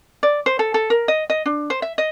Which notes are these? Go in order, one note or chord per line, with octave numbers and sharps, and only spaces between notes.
D5
C5
A4
A4
A#4
D#5
D#5
D4
C5
E5
D#5